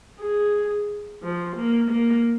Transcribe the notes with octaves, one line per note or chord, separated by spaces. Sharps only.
G#4
F3
A#3
A#3